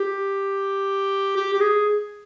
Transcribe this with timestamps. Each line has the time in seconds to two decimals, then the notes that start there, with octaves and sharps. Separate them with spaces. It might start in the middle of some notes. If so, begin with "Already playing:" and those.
Already playing: G4
1.36 G4
1.53 G4
1.60 G#4